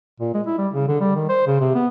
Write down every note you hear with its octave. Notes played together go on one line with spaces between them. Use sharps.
A#2
G#3
E4
G3
C#3
D3
G3
D#3
C5
C#3
C3
B3